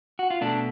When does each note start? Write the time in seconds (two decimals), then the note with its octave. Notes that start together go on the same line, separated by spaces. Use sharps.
0.19 F#4
0.31 F4
0.41 B2 A3 D4